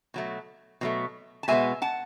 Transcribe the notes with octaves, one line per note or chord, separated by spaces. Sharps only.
B2 F#3 A3
B2 F#3 A3
A5
B2 G#3 B3 E5 G#5
F#5 A5